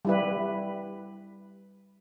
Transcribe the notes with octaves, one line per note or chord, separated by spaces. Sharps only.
G3 E4 B4